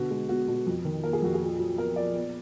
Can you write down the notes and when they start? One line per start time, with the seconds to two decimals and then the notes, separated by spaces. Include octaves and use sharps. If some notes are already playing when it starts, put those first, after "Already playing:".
Already playing: B2 D3 F#4
0.10 G#3
0.29 B3 F#4
0.48 B2
0.66 F2
0.85 D#3
1.04 A#3 A#4
1.13 G#4
1.22 F2 F#4
1.34 G#4
1.41 A#2
1.59 F#3
1.78 B3 A#4
1.96 A#2 D5
2.15 B3